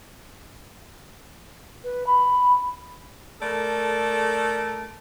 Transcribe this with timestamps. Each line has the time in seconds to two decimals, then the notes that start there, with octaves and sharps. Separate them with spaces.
1.83 B4
2.06 B5
3.41 A3 A4 A#4 D5